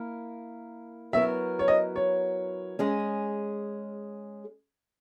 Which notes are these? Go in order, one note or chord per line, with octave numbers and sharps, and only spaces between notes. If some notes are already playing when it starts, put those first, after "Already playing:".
Already playing: A#3 E4 A#4
F#3 B3 E4 A#4 E5
C#5
D#5
C#5
G#3 C#4 G#4